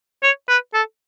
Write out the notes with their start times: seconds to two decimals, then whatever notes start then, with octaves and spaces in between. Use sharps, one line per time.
0.23 C#5
0.49 B4
0.74 A4